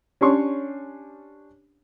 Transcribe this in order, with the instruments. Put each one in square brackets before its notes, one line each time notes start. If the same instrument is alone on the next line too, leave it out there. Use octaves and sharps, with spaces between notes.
[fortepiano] C#4 D4 G4 C#5 C6 C#6